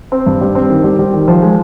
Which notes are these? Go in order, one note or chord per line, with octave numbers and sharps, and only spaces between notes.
C4
G2
G3
C4
D#3
G3
G3
D#3
F3
G#3